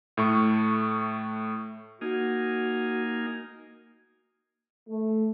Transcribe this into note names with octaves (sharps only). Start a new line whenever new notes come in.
A2 A3 C#6
A#3 D#4 F#4 G#5
A3